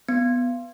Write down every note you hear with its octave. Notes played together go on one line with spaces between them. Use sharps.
B3